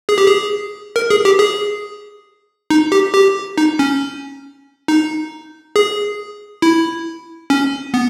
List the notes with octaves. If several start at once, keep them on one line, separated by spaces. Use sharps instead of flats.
G#4
G4
G#4
A#4
G#4
G4
G#4
D#4
G4
G4
D#4
C#4
D#4
G#4
E4
C#4
B3